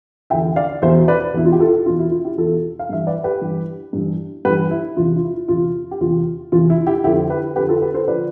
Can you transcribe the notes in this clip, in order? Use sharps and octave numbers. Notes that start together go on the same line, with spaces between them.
E2 D3 F3 E5 G5
D5 F5
E2 B2 C5 E5
B4 D5
E2 B2 E4
F4
G4
F4 A4
E2 B2 F4
E4
F4
E4 G4
E2 B2 F4 A4
F5
G2 E3 E5
B4 D5
G4 B4
G2 E3
G2 E3
G2 E3 G4 B4
E4
E2 C3 E3 F4
F4
E4
E2 C3 E3 F4
G4
E2 C3 E3 F4
E2 C3 E3 F4
E4
E4 G4
F2 D3 F3 E4 G4
G4 B4
F2 D3 F3 G4 B4
F4 A4
G4 B4
A4 C5
D3 F3 B4 D5